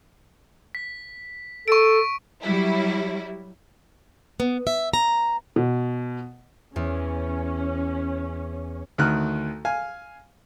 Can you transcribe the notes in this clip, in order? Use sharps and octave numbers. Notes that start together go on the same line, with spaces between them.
B6
A4 C#6 D7
F#3 G3 E4
B3
E5
A#5
B2
E2 C#4
D2 D#3 F6 F#6
F5 G#5